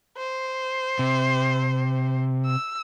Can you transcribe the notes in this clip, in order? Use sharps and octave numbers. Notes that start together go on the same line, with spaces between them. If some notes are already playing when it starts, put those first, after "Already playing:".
C5
C3
E6